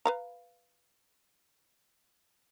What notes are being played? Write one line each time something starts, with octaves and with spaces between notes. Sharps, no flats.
B4 F5 A#5